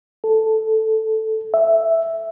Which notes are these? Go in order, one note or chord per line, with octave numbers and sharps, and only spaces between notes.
A4
E5